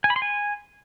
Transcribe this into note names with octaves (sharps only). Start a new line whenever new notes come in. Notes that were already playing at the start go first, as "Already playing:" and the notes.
G#5
B5
C6
G#5